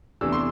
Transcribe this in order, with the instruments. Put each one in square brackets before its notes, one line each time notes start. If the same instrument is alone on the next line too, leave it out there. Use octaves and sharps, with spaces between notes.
[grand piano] E2 C3 E3 A3 D4 E6
C6